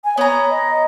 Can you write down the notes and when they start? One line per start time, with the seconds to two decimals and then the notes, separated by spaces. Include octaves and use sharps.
0.05 G#5
0.17 B3 C#5 A#5
0.50 D#5